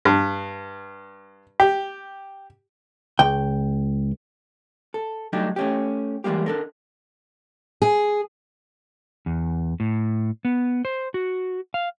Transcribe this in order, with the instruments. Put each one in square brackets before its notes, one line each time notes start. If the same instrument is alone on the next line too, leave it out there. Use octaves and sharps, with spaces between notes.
[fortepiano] G2
G4
[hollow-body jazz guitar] C#2 G5
A4
F#3 G3 A3 D4 D#4 G4
A3 C#4 G4
E3 G3 G#3 A#3 G4
D4 A4 A#4
[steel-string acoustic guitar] G#4
[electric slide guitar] E2
A2
B3
C5
F#4
F5